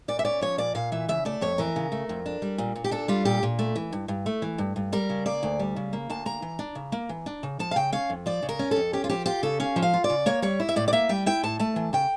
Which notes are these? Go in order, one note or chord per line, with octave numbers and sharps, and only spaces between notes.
A#2 D5
E5
C#4 D5
F3 C#5
A#2 D5
A#2 F5
E3 E5
C#3 E5
A3 D5
F2 C#5
E3 A#4
C#3
A3
F2
D4
G3
A#2
A#2
G4
D4 A4
G3 F4
A#2 G4
A#2
A3
E3
G2
G2
A3
E3
G2
G2
G3 A#4
C#3
A#3 D5
D2
G3
C#3
A#3
D2 A5
A#3 A#5
E3
D4
C#3
A#3
E3
D4
C#3
F3 A5
F5
C#3 G5
C#4 F5
F2
F3 D5
C#3
A#4
C#4
F2 A4
C#4 G4
F4
F3 G4
F4 G4
C#3 A4
C#4 F5
F3
F5
F4
D5
C#3
A#3 C#5
G3 C#5
E4
E5
A2 D5
D5
A#3 E5
G3 G5
E4 G5
A2 A5
A3 A5
E3
C#3 G5